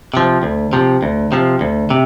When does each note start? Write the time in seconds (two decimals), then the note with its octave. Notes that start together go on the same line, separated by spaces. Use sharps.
0.14 C3 F3
0.43 D2
0.73 C3 F3
1.03 D2
1.32 C3 F3
1.61 D2
1.90 C3